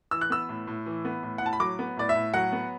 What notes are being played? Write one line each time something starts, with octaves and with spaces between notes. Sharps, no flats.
E3 E6
F#6
B3 E6
A2
A2
E3
B3
A2
F#5
A2 A5
B5
F#3 D6
B3
A2 D5
E5
A2
F#3 F#5
B3